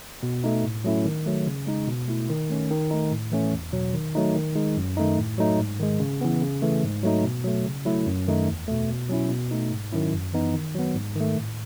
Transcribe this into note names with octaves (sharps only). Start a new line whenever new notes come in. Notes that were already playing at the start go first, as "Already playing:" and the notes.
B2
A3 D#4
A2
F#3 A3 C#4 E4
D#3
F#3 A3
C#3
G#3 D#4
B2
A3 E4
D#3
A3 C#4
D#3
A3 D#4
A2
E3 A3 C#4
E2
B2 F#3
D#3
F#3 A3 D#4
D#3
G#3 D#4
F#2
D#3 A3 D#4
A2
F#3 A3 D#4
G#2
D#3 G#3
C#3
E3 B3
C#3
E3 A3
G#2
F#3 A3 D#4
B2
F#3 A3
C#3
F#3 A3 E4
F#2
D#3 A3 D#4
E2
B2 A3
B2
F#3 C#4 E4
B2
A3 D#4
G#2
D#3 F#3 C#4 E4
F#2
E3 B3 D#4
D#3
F#3 B3
G#2
D#3
A3
A2